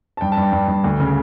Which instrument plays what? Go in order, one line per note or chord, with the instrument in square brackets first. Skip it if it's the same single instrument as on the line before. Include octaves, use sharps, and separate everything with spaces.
[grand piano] A5
G2 G5
A5
G2
G5
G2
G2
D2
C#3